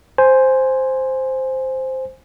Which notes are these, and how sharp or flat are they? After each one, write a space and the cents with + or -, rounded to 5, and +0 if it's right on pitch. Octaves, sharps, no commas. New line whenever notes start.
C5 +0 G#5 +0